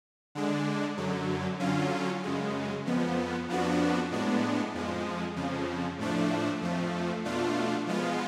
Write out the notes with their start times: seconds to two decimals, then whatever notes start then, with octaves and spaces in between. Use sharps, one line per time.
0.35 D3 G#3 D4
0.97 F#2 D3 F#3
1.60 D3 F#3 C#4 F4
2.23 F#2 C#3 G#3
2.86 F2 F3 B3
3.48 F2 F3 B3 D4 F#4
4.11 A2 G#3 B3 D4
4.74 F2 F3 G#3
5.36 F2 C#3 F3
5.99 A2 F3 A3 D4
6.61 F2 F3 A3
7.24 B2 A3 D4 F4
7.87 F3 G#3 B3 F4